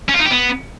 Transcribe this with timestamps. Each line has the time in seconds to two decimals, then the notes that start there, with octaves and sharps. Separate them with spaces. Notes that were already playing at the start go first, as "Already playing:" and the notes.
0.09 C#4
0.14 F4
0.20 D#4
0.25 G4
0.31 B3